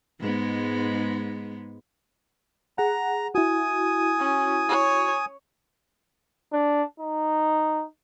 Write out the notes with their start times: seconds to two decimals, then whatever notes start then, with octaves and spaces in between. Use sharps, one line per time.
0.20 G#2 G#3 B3
2.78 G#4 F#5 A#5
3.35 E4 F#4 G#5 D#6
4.19 C#4
4.68 C#5
6.52 D4
7.00 D#4